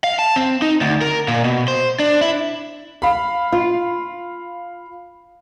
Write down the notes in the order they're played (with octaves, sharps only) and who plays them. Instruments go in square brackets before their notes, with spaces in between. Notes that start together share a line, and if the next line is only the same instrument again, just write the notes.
[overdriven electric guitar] F5
A5
C4
D#4
D2
A#4
A#2
B2
C5
D4
E4
[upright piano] F5 B5
[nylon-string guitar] F4